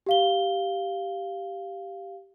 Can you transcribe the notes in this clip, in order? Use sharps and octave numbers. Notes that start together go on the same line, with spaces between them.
G4 F5 G7